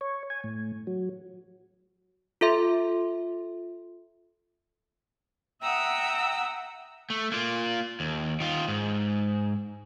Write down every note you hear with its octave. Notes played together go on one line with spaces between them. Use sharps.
C#5
G#5
A2
F#3
F4 A4 E5 C6
E5 F#5 G5 A#5 D#6 E6
A3
A#3 F4
D#2
D#3 F4
G#2